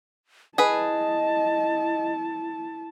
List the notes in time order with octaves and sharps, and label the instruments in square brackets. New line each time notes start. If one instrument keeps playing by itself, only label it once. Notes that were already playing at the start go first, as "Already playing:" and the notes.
[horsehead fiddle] E4 A5 [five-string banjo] G#4 B4 [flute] D#5